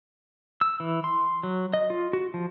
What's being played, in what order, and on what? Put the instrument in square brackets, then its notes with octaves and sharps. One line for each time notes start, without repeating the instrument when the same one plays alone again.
[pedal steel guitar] E6
E3
C6
F#3
D#5
F4
F#4
F3